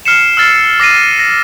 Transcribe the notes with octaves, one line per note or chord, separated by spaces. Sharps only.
F6 C7 C#7 E7
E6 F6 A6 C7
D6 A#6 C7 D#7
A#6